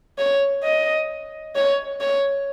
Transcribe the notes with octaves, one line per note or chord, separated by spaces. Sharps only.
C#5
D#5
C#5
C#5